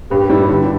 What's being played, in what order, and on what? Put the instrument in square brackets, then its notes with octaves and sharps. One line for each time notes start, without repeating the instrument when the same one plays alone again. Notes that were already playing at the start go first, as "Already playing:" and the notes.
[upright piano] G2 [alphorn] G4
[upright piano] G3 E4
D3